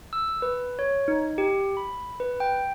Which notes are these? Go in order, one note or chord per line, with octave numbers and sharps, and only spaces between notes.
E6
B4
C#5
D#4
G4
B5
B4
G5